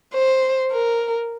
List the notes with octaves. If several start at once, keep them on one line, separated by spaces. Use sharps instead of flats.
C5
A#4